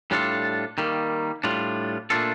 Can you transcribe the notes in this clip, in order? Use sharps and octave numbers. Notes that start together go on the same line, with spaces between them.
A2 G3 D4 F4 A4
D#3 G3 A#3
A2 G3 D4 F4
A#2 A3 D4 F4 A4